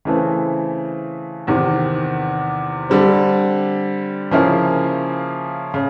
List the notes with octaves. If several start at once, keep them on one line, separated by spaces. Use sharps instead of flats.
C#3 E3 A3 C4
E2 C3 D#3
D3 G3 C4
C#3 F3 A#3 C#4 E4
C#3